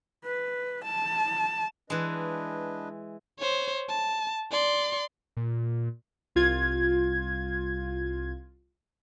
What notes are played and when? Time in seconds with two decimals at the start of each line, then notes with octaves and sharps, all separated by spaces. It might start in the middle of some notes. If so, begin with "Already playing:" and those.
0.24 B4
0.84 A5
1.90 E3 G#3 D4 B4 D#5
3.39 C5 C#5
3.89 A5
4.52 D5 C6
5.37 A#2
6.35 C2 F4 G#6